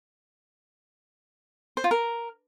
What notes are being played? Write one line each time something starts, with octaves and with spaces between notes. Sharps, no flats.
C5
F4
A#4